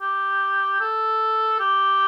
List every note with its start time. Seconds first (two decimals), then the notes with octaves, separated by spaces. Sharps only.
0.01 G4
0.80 A4
1.60 G4